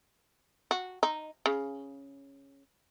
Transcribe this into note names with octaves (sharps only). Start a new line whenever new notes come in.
F#4
D#4
C#3